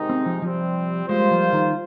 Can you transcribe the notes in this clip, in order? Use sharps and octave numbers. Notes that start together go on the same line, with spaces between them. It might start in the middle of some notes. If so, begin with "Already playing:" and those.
Already playing: C3 D#3 G#3 D#4
C4
F3
C3 F3 G3 C4
G3 G#3 A#3 F4 C5
F3
D#3